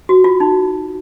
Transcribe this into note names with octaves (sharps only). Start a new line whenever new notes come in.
F#4
F4
D#4